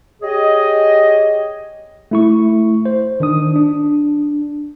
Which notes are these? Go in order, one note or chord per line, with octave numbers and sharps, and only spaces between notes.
G4 G#4 C#5 D#5
A3 E4 C#6
C5
D#3 D4 D#6
D4